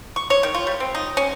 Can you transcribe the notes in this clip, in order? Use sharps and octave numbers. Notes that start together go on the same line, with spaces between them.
C#6
C#5
D#3
F4
G3
C4
D#4
C#4